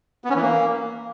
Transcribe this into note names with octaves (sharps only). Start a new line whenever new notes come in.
B3
C#4
E3
A#3